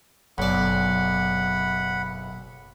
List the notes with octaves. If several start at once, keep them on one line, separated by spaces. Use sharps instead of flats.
F#1 B1 D5 F#5 B5